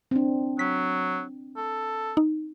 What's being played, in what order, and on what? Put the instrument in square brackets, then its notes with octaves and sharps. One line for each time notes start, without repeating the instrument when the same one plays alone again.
[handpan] C4 D4
[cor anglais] F#3 [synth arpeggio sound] B6
[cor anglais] A4
[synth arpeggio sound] D#4